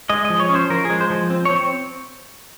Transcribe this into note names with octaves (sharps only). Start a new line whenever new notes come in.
G#3 D#5
D#5
F3
C#5
C#4
C5
F3 A#4
G#4
G#3
C5
F3
C4
C#5
C4